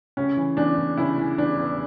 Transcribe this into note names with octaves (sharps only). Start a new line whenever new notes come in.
C#3 C#4
E3
E2 D4
E2
C#3 E4
E3
E2 D4
E2